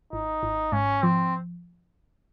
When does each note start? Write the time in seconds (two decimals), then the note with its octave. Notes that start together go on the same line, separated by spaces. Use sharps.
0.12 G#1 D#4
0.43 G#1
0.72 G#2 C#4
1.03 F3 C4